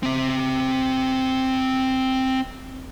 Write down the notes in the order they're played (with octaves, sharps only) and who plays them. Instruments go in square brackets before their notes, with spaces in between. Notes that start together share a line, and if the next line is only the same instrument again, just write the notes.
[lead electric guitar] C4 E5